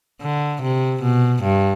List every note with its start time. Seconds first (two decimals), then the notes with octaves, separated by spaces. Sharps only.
0.21 D3
0.62 C3
1.02 B2
1.43 G2